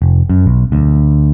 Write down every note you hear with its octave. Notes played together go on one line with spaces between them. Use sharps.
F1
F#2
B1
D2